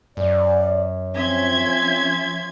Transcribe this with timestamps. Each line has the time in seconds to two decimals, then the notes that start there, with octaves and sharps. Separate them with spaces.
0.17 F#2 D5
1.14 F3 C4 C#4 E5 C6 G#6